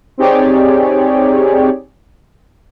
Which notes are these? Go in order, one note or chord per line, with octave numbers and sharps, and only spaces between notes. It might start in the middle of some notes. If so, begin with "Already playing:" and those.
C4 D#4 G4 G#4 C#5 D5